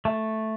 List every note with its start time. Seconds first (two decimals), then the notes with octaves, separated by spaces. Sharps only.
0.05 A3